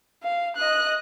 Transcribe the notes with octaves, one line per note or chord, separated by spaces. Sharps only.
F5
D#5 F#6